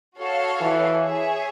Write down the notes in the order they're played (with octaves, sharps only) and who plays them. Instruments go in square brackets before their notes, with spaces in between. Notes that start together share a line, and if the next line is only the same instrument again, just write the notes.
[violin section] F#4 A4 C#5 F5
[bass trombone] E3
[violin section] G#4 C#5 E5